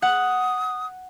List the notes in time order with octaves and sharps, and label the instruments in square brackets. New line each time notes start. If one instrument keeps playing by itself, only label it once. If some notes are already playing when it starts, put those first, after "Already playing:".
[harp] F#5 [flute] D#6